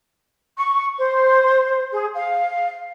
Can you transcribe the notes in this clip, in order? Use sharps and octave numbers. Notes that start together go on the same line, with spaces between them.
C#6
C5
G#4
F5